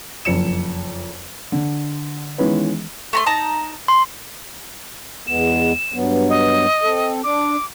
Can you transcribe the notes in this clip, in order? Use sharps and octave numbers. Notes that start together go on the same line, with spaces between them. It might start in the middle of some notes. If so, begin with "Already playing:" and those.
F#1 F2 C#7 E7
D3
D#3 E3 G#3 B3 C#4
A3 A#5 C6
D#4 A5 A#5
C6
E2 G#3 B3 E7
G2 F#3 B3
D#5
C4 A4
D4 D6